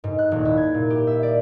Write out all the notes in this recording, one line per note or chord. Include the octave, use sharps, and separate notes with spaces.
G#2
F#6
D#1
E4
G#6
A#2
G4
E5
D5